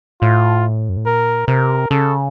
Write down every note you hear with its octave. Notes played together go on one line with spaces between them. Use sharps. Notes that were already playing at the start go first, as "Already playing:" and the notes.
A2 F4
F#2
A2
A#2 A#4
C3 A#4
C#3 A4